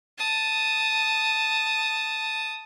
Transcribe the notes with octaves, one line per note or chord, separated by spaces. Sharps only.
A5 D#6